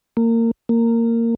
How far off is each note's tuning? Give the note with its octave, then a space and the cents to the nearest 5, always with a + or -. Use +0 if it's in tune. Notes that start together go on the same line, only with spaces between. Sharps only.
A#3 -25
A#3 -15